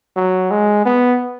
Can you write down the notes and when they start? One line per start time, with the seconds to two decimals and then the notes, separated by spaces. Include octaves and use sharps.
0.16 F#3
0.50 G#3
0.85 B3